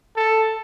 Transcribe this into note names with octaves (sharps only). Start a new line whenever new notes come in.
A4